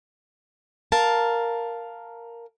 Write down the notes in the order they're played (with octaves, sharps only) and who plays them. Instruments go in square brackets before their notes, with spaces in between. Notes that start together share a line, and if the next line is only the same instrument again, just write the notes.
[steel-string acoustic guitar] A#4 F5 A5